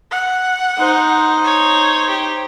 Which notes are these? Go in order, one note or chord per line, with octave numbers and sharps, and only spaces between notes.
F#5
D#4 C5
C#5
G4